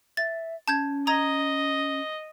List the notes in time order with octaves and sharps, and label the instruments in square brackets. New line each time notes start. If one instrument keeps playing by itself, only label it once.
[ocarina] E5 [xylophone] A6
[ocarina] C#4 [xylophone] A5 G6 G#6
[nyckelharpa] D#5 [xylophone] A#5 D#6 G#6